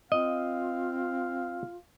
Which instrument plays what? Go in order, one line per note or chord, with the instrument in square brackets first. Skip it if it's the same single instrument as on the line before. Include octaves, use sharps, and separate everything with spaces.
[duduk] C4 [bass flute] F4 [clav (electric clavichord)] D#5 [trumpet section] F5